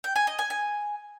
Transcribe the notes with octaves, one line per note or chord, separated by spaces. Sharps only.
G5
G#5
D#5
G#5
G#5